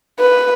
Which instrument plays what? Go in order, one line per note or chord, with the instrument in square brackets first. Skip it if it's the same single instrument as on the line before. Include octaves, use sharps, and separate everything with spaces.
[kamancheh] B4